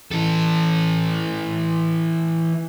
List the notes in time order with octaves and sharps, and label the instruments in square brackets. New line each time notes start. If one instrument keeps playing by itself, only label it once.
[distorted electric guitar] E3 A4